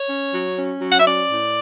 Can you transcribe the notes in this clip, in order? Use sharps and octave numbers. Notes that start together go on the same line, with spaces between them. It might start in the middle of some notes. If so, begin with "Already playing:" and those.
Already playing: C#5
C#4
F#3
C#4
F#3
F#5
E5
C#4 D5
A2